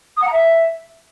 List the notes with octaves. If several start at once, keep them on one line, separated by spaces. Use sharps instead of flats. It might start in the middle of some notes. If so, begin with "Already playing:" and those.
D#6
F#5
A#5
E5